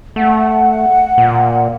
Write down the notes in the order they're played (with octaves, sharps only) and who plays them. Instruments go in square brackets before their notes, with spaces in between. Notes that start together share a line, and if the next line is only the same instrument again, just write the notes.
[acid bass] A3 [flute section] F#5
[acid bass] A#2